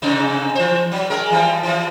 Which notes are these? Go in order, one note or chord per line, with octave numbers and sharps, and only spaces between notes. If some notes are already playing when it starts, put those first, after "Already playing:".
G#2 C3 D#4
E3 C5
F#3
G#3 A#4
E3 F3 G3
E3 F3